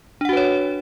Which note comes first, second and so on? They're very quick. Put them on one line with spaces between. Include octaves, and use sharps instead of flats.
D4 F#5 F#4 B4 C#5